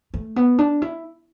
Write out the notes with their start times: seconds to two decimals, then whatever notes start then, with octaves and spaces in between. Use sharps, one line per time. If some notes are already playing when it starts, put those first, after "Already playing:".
0.14 A3
0.36 B3
0.58 D4
0.82 E4